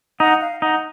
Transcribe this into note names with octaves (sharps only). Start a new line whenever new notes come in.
D#4 F#5
F5
D#4 F#5